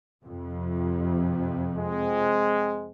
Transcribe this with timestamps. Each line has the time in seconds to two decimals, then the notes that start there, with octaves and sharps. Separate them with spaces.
0.23 F2 C3
1.76 G#3 C4